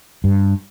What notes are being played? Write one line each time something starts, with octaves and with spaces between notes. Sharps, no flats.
G2